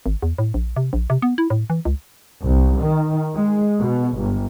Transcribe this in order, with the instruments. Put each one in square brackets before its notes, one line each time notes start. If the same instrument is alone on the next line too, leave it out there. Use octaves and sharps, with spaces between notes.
[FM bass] G#1
E2
A2
A#1
C3
A#1
C3
B3
E4
A2
E3
C#2
[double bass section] C2
D#3
G#3
B2
G1